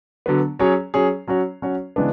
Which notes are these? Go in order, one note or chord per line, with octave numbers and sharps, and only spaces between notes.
D3 F#3 B3
F#3 C#4 G#4 C#5
F#3 C#4 G#4 C#5
F#3 C#4 F#4 C#5
F#3 C#4 F#4 C#5
C#3 E3 G#3 B3 D4